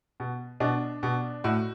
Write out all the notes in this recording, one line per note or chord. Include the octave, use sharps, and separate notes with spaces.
B2
B2 D4
B2
A2 F#4